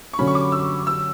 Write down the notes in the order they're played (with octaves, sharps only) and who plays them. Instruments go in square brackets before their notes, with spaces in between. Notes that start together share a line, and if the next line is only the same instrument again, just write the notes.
[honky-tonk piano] C#6
[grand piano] D3 F#3 C#4 [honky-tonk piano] B5
[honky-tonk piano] C#6
D6
E6
E6